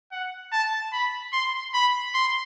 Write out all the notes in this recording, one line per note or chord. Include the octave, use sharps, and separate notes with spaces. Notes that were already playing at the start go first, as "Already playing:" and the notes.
F#5
A5
B5
C6
B5
C6